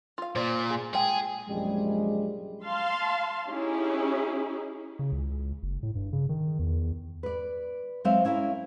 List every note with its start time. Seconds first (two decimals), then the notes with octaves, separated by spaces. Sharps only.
0.18 F4 F5
0.35 A#2 C5 D5
0.70 G#4
0.93 G#3 G#4 G5
1.48 A#1 F#2 C3 F3 G3 G#3
2.65 F5 A5 C6
3.47 C#4 D#4 E4 G4 G#4
4.99 C#3
5.12 C#2
5.63 F#1
5.83 A2
5.95 G2
6.13 C#3
6.29 D#3
6.59 E2
7.23 B4 D5
8.05 F#3 G#3 C4 C5 E5 F5
8.25 C#4 E4 A#4 F5